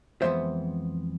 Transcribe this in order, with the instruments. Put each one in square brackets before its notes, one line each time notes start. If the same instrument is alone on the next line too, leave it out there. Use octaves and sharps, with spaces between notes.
[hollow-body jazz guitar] F2 E3 G#3 B3 C5 E5